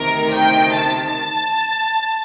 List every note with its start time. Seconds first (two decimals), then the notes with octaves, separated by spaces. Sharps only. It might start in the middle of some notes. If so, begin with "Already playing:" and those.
Already playing: D2 C3 D#3 A#4
0.31 G5
0.75 A5